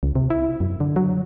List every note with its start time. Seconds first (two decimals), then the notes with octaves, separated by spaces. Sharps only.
0.03 C#2
0.15 C3
0.30 E4
0.60 F#2
0.80 D3
0.96 F#3